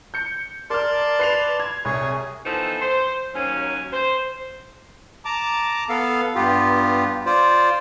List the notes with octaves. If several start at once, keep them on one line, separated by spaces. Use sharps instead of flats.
G6 C#7
A#4 D5 A5 C6 F6
B4 C7 F7
G#6
C2 G#4 C#5
E3 F3 B3 D#4 A4 C5
C5
D#2 F#3 C#4
C5
A5 A#5 D6
B3 A4 F5
G2 B3 F4 G4
F4 C5 D5